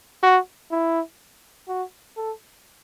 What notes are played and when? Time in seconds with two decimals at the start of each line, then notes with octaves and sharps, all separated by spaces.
0.23 F#4
0.71 E4
1.68 F#4
2.17 A4